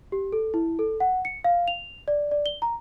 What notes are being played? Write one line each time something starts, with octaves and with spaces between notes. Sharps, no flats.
G4
A4
E4
A4
F#5
C#7
F5
F7
D5
D5
G7
A#5